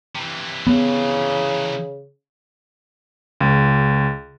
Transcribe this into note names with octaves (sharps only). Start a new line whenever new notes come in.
C3 E3
C#3 B3
C#2